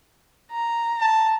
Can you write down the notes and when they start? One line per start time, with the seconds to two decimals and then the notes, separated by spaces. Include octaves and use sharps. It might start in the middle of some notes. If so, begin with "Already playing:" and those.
0.52 A#5
1.01 A5